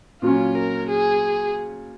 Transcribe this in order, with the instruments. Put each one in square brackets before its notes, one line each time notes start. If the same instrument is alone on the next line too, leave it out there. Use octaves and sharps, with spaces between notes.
[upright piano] A#2 F#3 C#4 [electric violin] F4
[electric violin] A#4
G#4